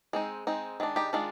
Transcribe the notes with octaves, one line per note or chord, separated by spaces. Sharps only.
G#3 C4 D#4
G#3 C4 D#4
D#3 G#3 D4
D#4 G4
D#3 G#3 D4 F4